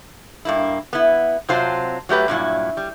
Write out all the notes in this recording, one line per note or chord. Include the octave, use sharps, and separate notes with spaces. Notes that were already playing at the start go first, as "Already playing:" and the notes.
G2 A#3 E4
B3 E4
C3 F#3 C4 F4 C5 A5
F#3 A3 G4 B4
G2 A#2 F#3 E4
G3